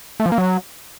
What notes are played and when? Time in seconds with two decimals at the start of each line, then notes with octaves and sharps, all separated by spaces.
0.20 A3
0.26 F3
0.32 A#3
0.38 F#3